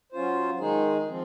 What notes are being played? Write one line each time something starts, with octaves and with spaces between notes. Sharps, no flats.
F#3 C#4 F4 C5
D#3 G#3 D#4 G#4
F3 C4